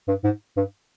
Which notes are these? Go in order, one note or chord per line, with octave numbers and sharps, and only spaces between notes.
G2
G#2
G2